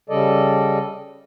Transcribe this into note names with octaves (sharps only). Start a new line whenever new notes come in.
C#3 G3 A4 D5 D#5